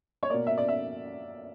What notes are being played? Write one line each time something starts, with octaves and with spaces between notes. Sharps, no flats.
C#5
B2 A#3 D5
E5
D5
E5